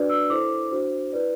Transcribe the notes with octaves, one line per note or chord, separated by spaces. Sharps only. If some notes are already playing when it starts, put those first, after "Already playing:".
Already playing: D4 F#4 B4 D5
E6
E4 A4 C5 D6
D4 F#4 C5
E4 B4 D5